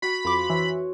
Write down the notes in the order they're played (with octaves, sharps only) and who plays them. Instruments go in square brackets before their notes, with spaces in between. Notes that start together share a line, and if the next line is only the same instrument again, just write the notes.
[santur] F#4 [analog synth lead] B5
[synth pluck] F2 D6 [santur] C5
[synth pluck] E3 [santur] C#5